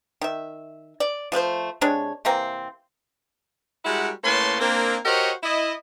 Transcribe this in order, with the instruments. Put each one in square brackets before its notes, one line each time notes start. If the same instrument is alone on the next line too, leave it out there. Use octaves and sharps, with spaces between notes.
[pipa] D#3 E5
D5
F3 A3 B4 C5
C3 G#3 D4 C#5
C3 E3 A#3 C4
[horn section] G3 G#3 E4 F#4 A#4 F#5
A2 A#3 C#4 B4 A5 C6
A#3 C4 D4
F#4 G4 A#4 C5 C#5 D#5
E4 D#5